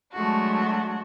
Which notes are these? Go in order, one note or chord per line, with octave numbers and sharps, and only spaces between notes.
F#3 G#3 A3 D4 F#4